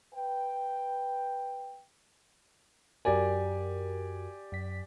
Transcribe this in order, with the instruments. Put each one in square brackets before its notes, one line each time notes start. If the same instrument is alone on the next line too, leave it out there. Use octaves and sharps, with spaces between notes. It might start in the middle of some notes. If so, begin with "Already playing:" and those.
[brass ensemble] B4 G5
[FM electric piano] F#2 F#4 A#4 [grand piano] G4 D5 G#5
[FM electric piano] F#2 B6